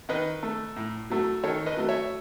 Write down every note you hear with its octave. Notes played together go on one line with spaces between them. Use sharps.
D#3 B4 D#5
A3
A2
F#3 A3
D#3 A4 C#5
B4 D#5
F#3 A3
C#5 E5